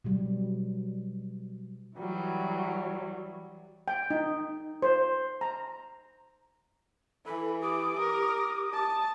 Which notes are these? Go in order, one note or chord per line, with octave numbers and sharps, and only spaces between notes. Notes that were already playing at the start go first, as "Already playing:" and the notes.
B2 F#3 G3
E3 F#3 G3
G5
D#4
C5
A#5
E3 A4 B5
G4 D6 D#6
A#4
A5